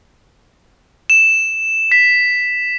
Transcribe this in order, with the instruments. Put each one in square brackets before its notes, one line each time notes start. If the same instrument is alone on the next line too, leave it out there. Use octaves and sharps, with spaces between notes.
[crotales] E7
B6